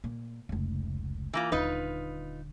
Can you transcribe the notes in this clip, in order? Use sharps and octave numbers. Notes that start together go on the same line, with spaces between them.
A#2
F1 C#2
E3 A#3 F4
D#1 D3 D#4 F4 B4